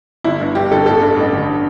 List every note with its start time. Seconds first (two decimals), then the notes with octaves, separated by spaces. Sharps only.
0.24 G1 E4
0.41 G2
0.55 G2 G4
0.71 G1 A4
0.86 A1 A4
1.02 G2
1.17 A1
1.33 D3